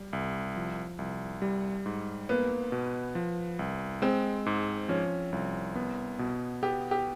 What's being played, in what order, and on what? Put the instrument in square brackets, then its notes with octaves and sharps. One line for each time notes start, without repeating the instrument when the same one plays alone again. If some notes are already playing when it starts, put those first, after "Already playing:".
Already playing: [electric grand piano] G3
C2
F3
C2
G3
G#2
[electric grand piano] A#3 [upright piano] B3
[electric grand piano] B2
F3
C2
[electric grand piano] G#3 [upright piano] C4
[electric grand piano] G#2
[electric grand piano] F3 [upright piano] C#4
[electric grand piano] C2
B3
B2
[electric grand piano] B3 [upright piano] G4
[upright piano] G4